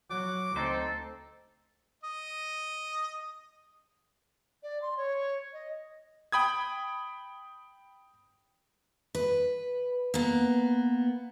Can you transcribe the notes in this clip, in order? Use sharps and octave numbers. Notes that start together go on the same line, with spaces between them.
F#3 F#5 D6
D2 C4 D#4 A4 C5
D#5
D5
C6
C#5
D#5
G5 B5 D#6 G#6
B4
A#3 B3